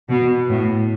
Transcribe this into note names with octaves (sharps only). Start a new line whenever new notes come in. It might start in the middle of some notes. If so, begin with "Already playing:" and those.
B2
A2